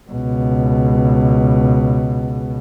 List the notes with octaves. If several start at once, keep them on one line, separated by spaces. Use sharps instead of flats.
C#2 B2